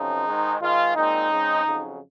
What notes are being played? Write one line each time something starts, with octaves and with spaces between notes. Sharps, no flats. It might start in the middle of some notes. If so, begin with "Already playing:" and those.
Already playing: F#2 C#3 F3 C4 D#4
G#2 D#3 G#3
G#2 D#3 G#3 F4
A#2 G#3 C4 D#4
C#3 G#3 C4
F2 C#3 F#3